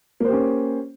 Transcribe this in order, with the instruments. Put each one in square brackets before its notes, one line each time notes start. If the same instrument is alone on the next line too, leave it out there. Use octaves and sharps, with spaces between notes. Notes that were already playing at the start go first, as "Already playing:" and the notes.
[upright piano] A#3
C5
G4
C#4